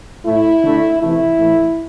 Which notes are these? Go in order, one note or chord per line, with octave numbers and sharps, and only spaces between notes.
A2 A3 E4
D3 A3
C3 E3 A3 E4
A2 E3 A3